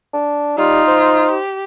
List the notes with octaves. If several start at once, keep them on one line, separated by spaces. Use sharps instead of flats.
D4
G3 D#4 F4
C5
G4